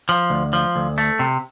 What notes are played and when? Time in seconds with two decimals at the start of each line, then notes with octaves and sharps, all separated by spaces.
0.09 F3
0.30 D2
0.53 F3
0.76 D2
0.98 A3
1.19 C3